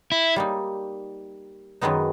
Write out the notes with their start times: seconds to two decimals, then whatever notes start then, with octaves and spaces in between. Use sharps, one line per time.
0.12 E4
0.36 G3 A#3 D#4
1.81 F#2 D#3 G#3 B3 D#4